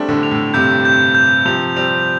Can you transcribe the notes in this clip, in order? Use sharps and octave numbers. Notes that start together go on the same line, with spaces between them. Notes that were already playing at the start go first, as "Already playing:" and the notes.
Already playing: G3 A3 C4 D4
A2 D3
F7
A2
G2 C3 G6
G6
G6
C3 F3 F7
G3 C4 F7